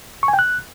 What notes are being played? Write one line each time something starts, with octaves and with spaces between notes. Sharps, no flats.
C#6
G#5
G5
F#6